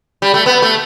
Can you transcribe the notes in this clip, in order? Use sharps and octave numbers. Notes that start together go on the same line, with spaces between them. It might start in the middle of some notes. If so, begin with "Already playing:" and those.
G3
A3
B3
A3